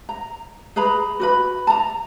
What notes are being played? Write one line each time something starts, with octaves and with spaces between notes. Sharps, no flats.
A#5
G#4 B4 A#5 B5
F#4 B4 B5
A5 A#5